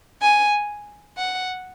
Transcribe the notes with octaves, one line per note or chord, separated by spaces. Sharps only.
G#5
F#5